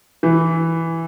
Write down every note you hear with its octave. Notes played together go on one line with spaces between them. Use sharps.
E3